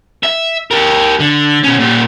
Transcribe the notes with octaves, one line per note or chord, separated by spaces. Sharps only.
E5
G4 A#4
D3
B2 C#4
A#2 G3